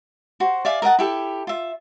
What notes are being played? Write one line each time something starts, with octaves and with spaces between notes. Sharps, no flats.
F#4 C5
D5 E5 F5 G#5
A#4 D#5 F#5 A5
E4 G4 A4
F4 E5